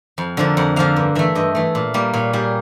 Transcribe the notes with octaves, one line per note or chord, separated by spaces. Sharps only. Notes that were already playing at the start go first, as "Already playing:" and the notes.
F2
D3 F3 A#3
F2 F#5
D3 F3 A#3 F5
G2
E3 A3 E5
G2 D#5
E3 A3
A#2
G3 A#3
A#2 C#5
G3 A#3 G#4